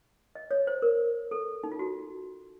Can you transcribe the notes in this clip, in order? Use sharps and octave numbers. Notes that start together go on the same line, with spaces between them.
D#5
C#5
C5
A#4
A4
D#4
F4
F#4